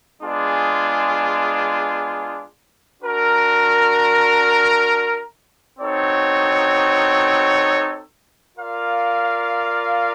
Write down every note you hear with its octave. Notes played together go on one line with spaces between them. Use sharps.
G#3 B3 D4 F4 G#4
D4 F#4 A#4
C4 D#4 F#4 A4 C#5
F4 A#4 D5 F5